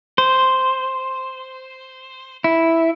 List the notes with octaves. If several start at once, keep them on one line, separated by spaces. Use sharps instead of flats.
C5
E4